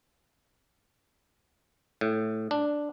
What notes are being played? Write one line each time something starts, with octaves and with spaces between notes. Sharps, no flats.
A2
D4